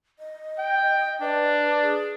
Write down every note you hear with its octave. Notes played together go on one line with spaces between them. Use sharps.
D#5
G5
D4 B4
G#4